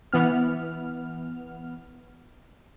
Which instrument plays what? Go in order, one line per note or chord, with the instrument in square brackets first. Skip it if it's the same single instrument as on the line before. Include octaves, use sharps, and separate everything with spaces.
[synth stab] E3 B3 F6